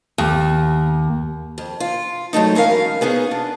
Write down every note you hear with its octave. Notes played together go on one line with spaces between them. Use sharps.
D#2
F2
F4
F#3 G#3 A3 D#4
E3 C#4 A#4 F5
B3 C#4 D#4 G#4
D4